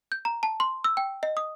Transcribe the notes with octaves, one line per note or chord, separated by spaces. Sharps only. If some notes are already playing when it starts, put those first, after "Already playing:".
G6
A#5
A5
C6
E6
G5
D#5
D#6